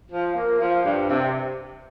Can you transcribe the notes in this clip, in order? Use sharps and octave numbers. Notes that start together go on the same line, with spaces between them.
F3
A#3
F3
G2
C3